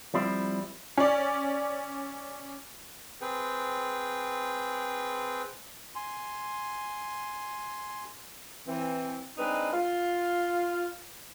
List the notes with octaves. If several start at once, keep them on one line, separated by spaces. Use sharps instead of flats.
F3 G3 C4 E4
C#4 D5
C4 G#4 B4 G5
G#5 C6
E3 C4
G#3 C4 D4 D#4 B4
F4